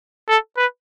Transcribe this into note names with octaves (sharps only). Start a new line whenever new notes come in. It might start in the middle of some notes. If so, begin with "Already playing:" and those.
A4
B4